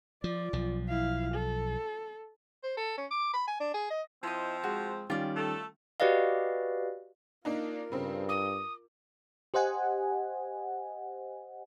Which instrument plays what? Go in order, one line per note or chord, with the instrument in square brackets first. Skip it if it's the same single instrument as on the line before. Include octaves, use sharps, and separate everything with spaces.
[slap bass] F3 [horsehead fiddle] F4 D5
[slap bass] B1 F3
[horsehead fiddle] E4 F5
A4
[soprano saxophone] C5
A4
C#4
D6
B5
G#5
D4
G#4
D#5
[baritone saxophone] F3 [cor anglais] C4 [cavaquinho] E4 D#5
[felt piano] G#3 [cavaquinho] F#4
[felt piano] D#3 G3 C#4 [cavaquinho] F4 D5
[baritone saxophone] A3 [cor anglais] A4
[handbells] F#4 G4 B4 D5 D#5 F5
[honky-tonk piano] A#3 D4 D#4 [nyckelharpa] F4 A#4
[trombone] G2 [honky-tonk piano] C#3 C4
[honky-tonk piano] D6 [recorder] D#6
[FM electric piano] G4 C5 D#5 F#5 G#5